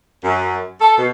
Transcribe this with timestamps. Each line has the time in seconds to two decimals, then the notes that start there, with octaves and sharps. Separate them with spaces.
0.24 F#2
0.81 A4
0.98 B2